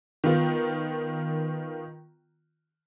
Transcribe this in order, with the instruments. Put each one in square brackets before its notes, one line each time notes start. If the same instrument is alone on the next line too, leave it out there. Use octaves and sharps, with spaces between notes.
[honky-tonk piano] D#3 B3 F4